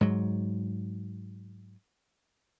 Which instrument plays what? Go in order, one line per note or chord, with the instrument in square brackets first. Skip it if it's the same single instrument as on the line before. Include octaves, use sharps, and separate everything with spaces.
[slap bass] G#2 F#3